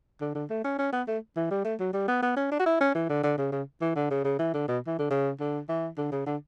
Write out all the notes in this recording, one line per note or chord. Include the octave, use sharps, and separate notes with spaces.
D3
D3
A3
C#4
C#4
B3
A3
E3
G3
A3
F#3
G3
B3
B3
C#4
D4
F#4
E4
C#4
E3
D3
D3
C#3
C#3
E3
D3
C#3
C#3
E3
D3
B2
E3
D3
C#3
D3
E3
D3
C#3
D3